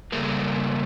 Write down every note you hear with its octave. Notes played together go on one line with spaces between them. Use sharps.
C#3 G3 A3 A#3 G#4